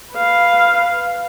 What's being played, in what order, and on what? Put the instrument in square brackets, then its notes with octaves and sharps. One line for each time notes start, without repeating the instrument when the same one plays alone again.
[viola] B4 F5